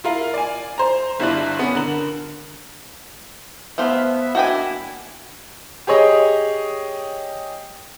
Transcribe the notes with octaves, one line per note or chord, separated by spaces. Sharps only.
E4 F4 A#4 F5
D5 G#5
C5 A#5
G1 G2 E4 F4 D5 F#6
B3 C#4
D3 A#4 F#7
A3 B3 C5 E5 F5
A#3 D4 E4 F#4 G5 G#5
G4 G#4 C#5 D#5